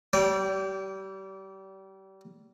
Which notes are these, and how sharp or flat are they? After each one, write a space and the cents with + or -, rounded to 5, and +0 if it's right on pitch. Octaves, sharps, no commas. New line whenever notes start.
G3 -30 D5 -35 G5 +0